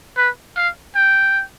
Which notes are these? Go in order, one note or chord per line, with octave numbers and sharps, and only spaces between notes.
B4
F5
G5